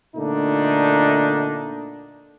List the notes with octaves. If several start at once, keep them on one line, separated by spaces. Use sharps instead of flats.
A#2 D3 A3 D4 D#4